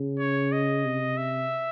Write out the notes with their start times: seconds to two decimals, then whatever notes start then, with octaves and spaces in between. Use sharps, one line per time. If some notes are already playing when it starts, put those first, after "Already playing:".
Already playing: C#3
0.20 C#5
0.52 D#5
0.85 C3
1.17 E5